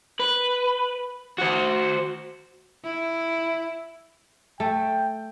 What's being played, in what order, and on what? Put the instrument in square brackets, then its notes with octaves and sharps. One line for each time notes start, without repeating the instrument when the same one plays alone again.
[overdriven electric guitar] B4
F#4 C5
[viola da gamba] E4
[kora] A3 [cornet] G5